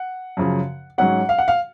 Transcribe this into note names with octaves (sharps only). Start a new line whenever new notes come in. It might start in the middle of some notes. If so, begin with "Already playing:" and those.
Already playing: F#5
F#2 C#3 F3
G#2 F#3 C#4 F#5
F5
F#5
F5